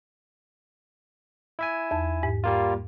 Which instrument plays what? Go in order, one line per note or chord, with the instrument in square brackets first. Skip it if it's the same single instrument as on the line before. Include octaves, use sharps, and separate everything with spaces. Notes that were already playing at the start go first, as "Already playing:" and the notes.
[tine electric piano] E4 E5 G#5
[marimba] E2 A5
G#2
[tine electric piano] G3 A#3 F4